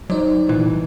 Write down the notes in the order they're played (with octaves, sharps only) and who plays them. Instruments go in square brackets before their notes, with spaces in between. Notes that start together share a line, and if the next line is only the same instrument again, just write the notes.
[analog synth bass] F#3 [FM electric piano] D#4 C5 D5
[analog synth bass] A#2 [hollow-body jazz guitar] E3
[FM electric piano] C2